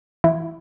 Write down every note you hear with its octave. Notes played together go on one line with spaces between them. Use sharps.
E3 E4